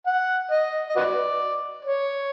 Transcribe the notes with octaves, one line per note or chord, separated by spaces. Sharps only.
F#5
D#5
D#5
F#4 B4 D5
C#5